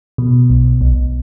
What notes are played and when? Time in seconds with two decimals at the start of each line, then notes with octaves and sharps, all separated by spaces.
0.18 B2
0.50 B1
0.81 B1